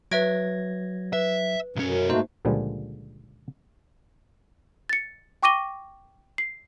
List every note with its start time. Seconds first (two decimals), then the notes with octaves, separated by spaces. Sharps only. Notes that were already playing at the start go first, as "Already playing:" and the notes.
0.11 F#3 B4 E5 G#6 A#6 D7
1.13 B4 E5
1.76 B1 F#2 C#4
2.09 G#2 A3 A#3 D#4 F#4 C5
2.45 C#2 A#2 D3 F3 G3 G#3
4.89 A6 C#7
5.43 G5 C#6 D6 A#6 D#7 G7
6.38 C7